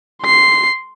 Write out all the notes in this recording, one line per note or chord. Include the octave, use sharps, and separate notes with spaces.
C6 C7